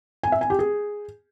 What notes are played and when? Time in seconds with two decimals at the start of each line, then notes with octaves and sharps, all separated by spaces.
0.23 G#5
0.32 E5
0.41 G#5
0.50 G4
0.59 G#4